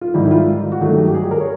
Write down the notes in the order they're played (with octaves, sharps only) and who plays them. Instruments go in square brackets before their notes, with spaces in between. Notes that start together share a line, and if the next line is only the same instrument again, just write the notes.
[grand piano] F4
G#2 D#3 G3 E4
E4
F4
F#4
G2 D#3 F#3 A3 F4
G4
G4
G#4
A#4
C#5